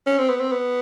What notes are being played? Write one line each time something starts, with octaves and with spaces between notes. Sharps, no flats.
C#4
C4
B3
C4
B3